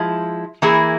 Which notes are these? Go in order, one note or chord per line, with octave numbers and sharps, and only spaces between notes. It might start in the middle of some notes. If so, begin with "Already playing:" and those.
Already playing: F3 G#3 E4
E3 A#3 E4 G#4